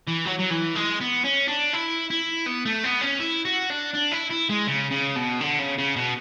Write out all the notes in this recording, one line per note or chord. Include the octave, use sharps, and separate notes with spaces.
E3
F#3
F#3
E3
G#3
B3
C#4
D4
E4
E4
B3
A3
B3
C#4
E4
F#4
D4
D4
E4
E4
G#3
C#3
C#3
B2
D3
C#3
C#3
B2